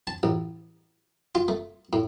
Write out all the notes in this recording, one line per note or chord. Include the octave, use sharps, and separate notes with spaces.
A5
A1
F4
A3
A2